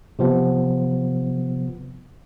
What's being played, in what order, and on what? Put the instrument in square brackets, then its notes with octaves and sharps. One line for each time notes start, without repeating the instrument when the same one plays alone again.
[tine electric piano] C3 F3 B3